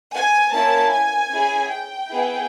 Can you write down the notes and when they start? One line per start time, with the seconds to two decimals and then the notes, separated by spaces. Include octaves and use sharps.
0.13 G#5
0.52 A#3 C#4 E4 A5
0.91 G#5
1.31 C#4 E4 G#4
1.70 G5
2.09 B3 E4 G#4